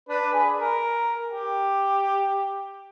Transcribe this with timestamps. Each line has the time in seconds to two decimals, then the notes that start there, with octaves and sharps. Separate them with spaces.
0.09 D4 B4
0.33 G#4 G#5 B5
0.58 A#4
1.28 G4